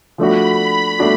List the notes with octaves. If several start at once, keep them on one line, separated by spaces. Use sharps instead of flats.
F3 A3 D4 F#4 B5
A3 D4 F#4